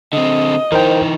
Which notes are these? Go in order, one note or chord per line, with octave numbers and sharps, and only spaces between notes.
D3 C4 D#5
E3 D#4 A#4 C5 G5